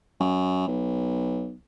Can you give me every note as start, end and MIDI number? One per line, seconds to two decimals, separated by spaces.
0.20 0.65 42
0.68 1.55 35